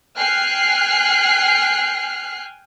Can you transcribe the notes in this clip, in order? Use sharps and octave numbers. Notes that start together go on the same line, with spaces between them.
G5 G#5 F6 F#6 C7